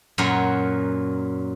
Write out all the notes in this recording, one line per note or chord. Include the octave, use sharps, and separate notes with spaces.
F#2 A#2 A#4 C#5 F#5